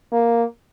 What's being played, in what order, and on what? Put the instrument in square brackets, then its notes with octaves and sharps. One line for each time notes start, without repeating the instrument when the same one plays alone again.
[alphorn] A#3